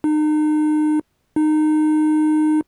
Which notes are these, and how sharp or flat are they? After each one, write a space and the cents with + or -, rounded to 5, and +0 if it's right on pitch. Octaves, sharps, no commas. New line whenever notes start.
D#4 -35
D#4 -20